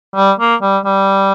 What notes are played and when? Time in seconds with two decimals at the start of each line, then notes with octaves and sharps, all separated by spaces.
0.16 G3
0.39 A#3
0.62 G3
0.85 G3